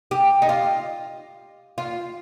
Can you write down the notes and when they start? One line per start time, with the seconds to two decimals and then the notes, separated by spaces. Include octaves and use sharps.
0.11 G4
0.42 D#4
0.49 F4
1.78 F4